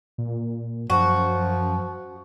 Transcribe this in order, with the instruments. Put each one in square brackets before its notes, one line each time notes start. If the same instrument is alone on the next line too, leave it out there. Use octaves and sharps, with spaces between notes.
[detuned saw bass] A#2
[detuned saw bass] F#2 [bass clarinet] F3 [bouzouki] F#4